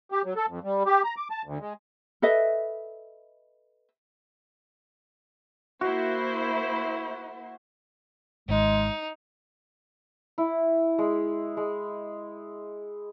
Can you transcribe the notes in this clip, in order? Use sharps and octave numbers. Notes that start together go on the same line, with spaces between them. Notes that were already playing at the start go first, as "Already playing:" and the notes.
G4
F#3
A4
F2
G3
G4
A#5
D6
A5
D2
G#3
A4 B4 D#5 E5
A#3 E4 F#4 C5
G#1 G#3 D#4
E4
G#3
G#3